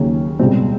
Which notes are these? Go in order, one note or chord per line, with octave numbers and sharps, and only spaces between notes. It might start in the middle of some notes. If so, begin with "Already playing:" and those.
Already playing: D#2 C#3 F#3 A#3 C#4
C#2 B2 G3 C4